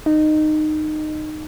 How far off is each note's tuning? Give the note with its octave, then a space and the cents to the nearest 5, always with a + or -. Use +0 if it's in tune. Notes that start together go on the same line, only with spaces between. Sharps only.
D#4 -20